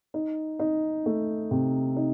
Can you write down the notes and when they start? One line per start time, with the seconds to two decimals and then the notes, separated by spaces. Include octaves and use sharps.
0.14 D#4
0.59 D#4
1.06 A3
1.51 C3
1.96 D#4